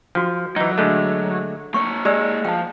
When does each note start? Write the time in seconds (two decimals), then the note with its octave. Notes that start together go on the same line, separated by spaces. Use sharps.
0.15 F3 F#4 G5
0.56 E3 F#3 D#4
0.78 D3 G#3 A3
1.74 A#3 C#5 C#6
2.05 G#3 G4 D5 E6
2.45 F3 G5 A5